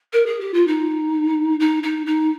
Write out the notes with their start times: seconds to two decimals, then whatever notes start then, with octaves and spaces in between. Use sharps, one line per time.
0.13 A#4
0.26 G#4
0.40 G4
0.54 F4
0.67 D#4
1.60 D#4
1.83 D#4
2.06 D#4